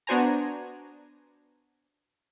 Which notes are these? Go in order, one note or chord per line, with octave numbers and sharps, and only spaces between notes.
B3 D4 F#4 C5 G#5 A#5